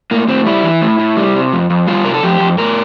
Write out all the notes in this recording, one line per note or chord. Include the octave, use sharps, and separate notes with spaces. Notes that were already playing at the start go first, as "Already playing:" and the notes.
A2 A#3
A2 C4
G3 E4
E3
A2
A2
G3
C3
F2
F2
G3 F4
C3 A#4
A4
F2 G4
F2
A2 A#4